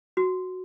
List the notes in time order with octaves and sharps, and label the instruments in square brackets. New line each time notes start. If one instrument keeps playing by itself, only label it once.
[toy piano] F#4